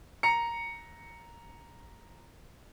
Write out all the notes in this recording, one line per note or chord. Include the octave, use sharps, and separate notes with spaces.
A#5 C#7